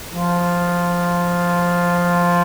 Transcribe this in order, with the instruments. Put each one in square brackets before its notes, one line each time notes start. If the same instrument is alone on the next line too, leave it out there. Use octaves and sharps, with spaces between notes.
[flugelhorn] F3